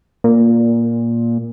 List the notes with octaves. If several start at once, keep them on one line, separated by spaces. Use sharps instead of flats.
A#2